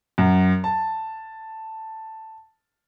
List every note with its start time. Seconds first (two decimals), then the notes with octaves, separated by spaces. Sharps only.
0.18 F#2
0.64 A5